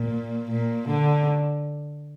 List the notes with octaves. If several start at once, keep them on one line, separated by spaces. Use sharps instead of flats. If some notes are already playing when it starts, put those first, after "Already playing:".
Already playing: A#2
A#2
D3